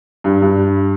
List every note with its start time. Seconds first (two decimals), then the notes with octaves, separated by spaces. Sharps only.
0.24 G2
0.42 G2